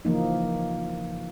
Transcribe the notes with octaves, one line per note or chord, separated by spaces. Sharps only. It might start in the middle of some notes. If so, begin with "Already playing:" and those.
C#3 E3 F3 A#3 D#4